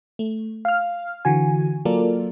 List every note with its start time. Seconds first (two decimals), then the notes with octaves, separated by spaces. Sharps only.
0.19 A3
0.65 F5 F6
1.25 D3 E3 F#4 G#5
1.85 F#3 A#3 F4 A4 A#4 D5